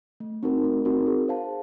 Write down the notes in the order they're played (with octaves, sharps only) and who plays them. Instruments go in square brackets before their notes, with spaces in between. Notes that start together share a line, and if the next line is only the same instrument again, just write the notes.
[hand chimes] A3
C4 D#4 F#4 A#4
A3
C4 D#4 F#4 A#4
G#4
C5 F5 A5